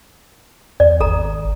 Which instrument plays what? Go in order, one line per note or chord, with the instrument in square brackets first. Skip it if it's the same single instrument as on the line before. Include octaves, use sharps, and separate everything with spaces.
[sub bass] E2 [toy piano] D5
[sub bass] G#1 [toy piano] A4 A#5